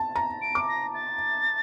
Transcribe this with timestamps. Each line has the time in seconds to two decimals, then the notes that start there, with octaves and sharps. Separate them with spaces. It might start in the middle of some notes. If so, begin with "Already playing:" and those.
Already playing: A5
0.16 A#5
0.42 D7
0.55 D6
0.68 A#6
0.94 A6